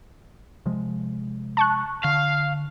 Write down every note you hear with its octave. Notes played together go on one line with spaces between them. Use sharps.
C3 F3 G#3
A5 C#6 F#6
D3 F5